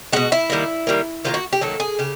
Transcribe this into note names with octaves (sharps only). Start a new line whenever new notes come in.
B2 G#3 F#4
E4
D#3 G3 A#3
D#3 G3 A#3
D#3 F#3 A#3 F4
F#4
G4
D#3 F#3 A#3 A4
G#4
C#3 G4